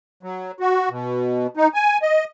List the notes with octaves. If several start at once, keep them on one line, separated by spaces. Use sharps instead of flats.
F#3
F#4
B2
D#4
G#5
D#5